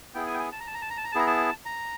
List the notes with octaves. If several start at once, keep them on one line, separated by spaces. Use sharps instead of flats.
B3 E4 G#4 G5
G#5
G5
G#5
A5
A#5
A5
A#5
A5
A#5
A5
A#5
A5
B3 E4 G#4 A#5
A5
A#5